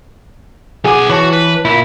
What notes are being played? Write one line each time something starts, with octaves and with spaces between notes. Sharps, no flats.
B1 G#4 F#5 G#5 D6
E3 F#4 C#5 A5
B4
A#2 E4